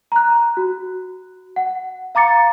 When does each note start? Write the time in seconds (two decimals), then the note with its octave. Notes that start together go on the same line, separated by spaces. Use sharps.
0.12 A#5 F#6
0.57 F#4
1.56 F#5
2.15 F5 A#5 D6 A6 C#7